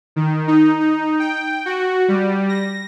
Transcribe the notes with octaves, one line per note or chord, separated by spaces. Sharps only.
D#3
D#4
D#4
G5
F#4
G3
A#6